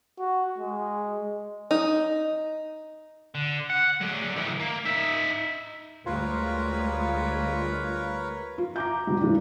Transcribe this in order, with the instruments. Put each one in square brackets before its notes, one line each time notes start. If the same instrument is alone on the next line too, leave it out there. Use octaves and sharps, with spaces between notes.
[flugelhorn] F#4
G#3
[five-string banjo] D#4
[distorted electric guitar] D3
F#5
D3 F#3
D#3 E4
A#3
D#4 E5
[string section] D2 G3 G#3 [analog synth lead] F4 [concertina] A#4 B4 C#5
[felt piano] F4
A#5 D6 G6
B2 D#3 G3
G2 E3 A3 D4